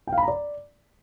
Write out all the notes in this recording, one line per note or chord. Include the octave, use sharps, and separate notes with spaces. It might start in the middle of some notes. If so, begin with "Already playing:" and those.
G5
F5
B5
A#5
D5